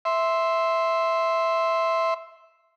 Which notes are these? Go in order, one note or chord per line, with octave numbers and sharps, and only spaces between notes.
E5 C6